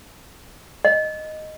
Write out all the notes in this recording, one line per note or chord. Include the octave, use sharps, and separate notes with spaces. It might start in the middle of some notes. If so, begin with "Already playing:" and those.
D#5